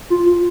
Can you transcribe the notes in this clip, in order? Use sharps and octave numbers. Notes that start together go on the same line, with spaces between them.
F4
F4